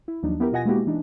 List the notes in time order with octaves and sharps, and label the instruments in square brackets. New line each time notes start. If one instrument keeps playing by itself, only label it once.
[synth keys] E4
D#2 F3 F#3 D4 D#4
B3 E4 G4 A#4
B2 F4 D#5 F#5 G#5 A#6
G#3 A#3 B3 E4 F#4 G4
E3 D4 D#4